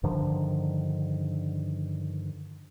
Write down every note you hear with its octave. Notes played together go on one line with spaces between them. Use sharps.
G2 D3 D#3 F3